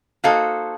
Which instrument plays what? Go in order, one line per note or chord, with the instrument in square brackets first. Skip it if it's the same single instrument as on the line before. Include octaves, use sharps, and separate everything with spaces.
[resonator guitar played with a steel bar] A#3 D#4 F#4 A4 C5 [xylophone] F5